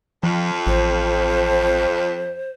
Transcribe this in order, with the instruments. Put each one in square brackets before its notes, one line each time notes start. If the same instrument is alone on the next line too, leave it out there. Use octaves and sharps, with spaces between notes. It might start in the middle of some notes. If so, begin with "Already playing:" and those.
[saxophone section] F2 [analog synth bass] F3
[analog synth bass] A1 [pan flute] C5